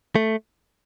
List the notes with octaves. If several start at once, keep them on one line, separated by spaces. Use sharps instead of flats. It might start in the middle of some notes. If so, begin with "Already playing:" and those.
A3